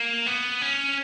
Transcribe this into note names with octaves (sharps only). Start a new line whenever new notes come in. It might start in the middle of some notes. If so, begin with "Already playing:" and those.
Already playing: A#3
B3
C#4